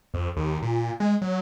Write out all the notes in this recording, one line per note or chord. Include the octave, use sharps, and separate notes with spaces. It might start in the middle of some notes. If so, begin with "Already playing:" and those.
F2
D#2
A#2
G#3
F#3